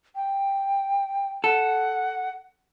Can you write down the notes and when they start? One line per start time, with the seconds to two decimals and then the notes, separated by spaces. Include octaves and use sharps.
0.15 G5
1.44 A4 F#5